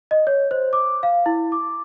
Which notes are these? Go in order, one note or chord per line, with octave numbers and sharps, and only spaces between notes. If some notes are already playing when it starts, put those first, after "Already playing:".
D#5
C#5
C5
D6
F5
E4
D6